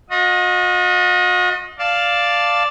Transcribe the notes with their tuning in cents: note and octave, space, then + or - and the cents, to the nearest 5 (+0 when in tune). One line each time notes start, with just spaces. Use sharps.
F#4 -45 D#5 +10
D5 +0 F5 +0 A5 +0